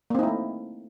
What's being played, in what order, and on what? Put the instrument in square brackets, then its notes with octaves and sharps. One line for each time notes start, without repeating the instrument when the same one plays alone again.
[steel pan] A#3
C4
D#4
E4
A3